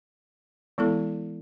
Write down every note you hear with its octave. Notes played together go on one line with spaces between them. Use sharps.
E3 G#3 B3 E4 A4